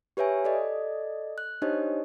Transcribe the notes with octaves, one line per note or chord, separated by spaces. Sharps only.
G4 B4 C#5 E5 G#5
A4 D5 D#5
F#6
D4 D#4 G4 C5 C#5 D#5